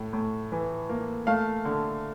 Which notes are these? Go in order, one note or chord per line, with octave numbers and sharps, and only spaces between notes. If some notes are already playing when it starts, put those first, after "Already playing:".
Already playing: A2
A2
E3
A#3
A3 F5
D3